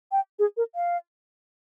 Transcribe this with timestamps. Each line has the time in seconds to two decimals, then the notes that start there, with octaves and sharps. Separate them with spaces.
0.12 G5
0.39 G#4
0.57 A#4
0.75 F5